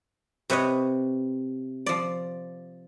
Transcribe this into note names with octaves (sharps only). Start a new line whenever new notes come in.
C3 B4 C#5 D#5
F3 D5